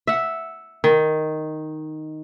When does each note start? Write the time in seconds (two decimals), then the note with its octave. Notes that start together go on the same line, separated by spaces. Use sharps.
0.07 E5 F#5
0.84 D#3